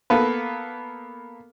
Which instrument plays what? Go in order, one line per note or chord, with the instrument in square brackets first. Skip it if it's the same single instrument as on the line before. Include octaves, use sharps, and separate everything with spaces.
[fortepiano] A#3 B3 A4 B4